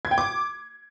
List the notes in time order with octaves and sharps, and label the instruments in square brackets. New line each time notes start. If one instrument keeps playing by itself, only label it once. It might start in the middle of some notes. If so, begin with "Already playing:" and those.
[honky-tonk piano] G#6
G5
D6